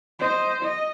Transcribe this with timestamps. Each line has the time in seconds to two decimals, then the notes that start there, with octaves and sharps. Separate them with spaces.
0.19 C5 D#5
0.63 D#5